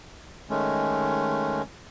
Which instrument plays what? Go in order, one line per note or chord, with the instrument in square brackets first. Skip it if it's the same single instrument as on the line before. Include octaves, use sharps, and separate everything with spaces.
[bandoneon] D#3 G#3 A3 C#4